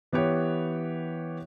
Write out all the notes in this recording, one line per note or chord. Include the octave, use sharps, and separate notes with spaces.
E3 B3 G4 C#5